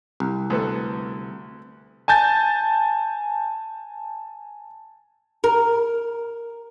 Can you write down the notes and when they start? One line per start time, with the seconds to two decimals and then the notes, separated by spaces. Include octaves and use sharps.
0.20 C2
0.50 D2 B3 A4
2.08 G#5 A5 G6 A6
5.44 A#4